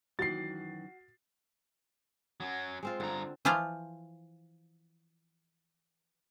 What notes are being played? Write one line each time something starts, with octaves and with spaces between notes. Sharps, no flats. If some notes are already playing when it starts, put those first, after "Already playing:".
F#2 D#3 E3 F#4 A6 C7
F#3 C#4
G#3 C4 F4
G2 D3 A#5
E3 F3 F4 C5 F5